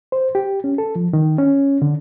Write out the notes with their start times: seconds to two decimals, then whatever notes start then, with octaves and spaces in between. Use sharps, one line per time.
0.12 C5
0.35 G4
0.64 C#4
0.78 A4
0.96 F3
1.13 D#3
1.38 C#4
1.82 D3